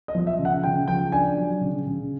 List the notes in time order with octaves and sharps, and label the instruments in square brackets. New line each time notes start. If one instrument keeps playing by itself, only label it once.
[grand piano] D#5
F3
E5
C#3
F#5
C#3 G5
F3 G5
D4 G#5
F#3
C#3
C#3